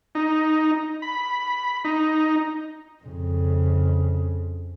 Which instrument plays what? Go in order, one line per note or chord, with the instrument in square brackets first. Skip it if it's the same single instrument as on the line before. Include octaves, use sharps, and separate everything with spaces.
[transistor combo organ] D#4
B5
D#4
[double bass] F2 C#3